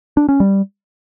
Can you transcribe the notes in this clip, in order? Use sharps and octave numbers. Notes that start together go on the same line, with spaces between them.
D4
C#4
G3